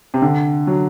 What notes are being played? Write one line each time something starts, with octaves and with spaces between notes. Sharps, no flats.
C3
D3
F#3